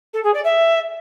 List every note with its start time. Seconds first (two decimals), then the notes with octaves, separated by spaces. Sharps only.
0.13 A4
0.24 G#4
0.34 D5
0.44 E5